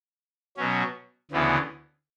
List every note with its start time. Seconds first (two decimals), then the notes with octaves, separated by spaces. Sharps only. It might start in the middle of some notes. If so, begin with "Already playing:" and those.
0.57 B2 F#3 C#4
1.31 D2 C#3 E3 B3